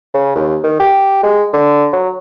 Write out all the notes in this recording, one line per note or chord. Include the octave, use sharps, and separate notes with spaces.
C#3
D#2
D#3
G4
G#3
D3
F#3